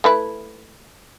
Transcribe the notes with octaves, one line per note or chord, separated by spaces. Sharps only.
A3 E4 B4